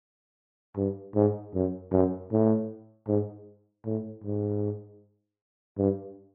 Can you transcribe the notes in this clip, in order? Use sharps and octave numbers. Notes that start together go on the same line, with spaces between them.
G2
G#2
F#2
F#2
A2
G#2
A2
G#2
G2